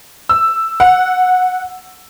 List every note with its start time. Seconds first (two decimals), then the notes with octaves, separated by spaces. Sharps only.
0.29 E6
0.80 F#5